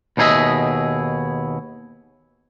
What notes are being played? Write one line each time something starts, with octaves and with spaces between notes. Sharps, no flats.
D#2 B2 D#4 G#4 D#5 E5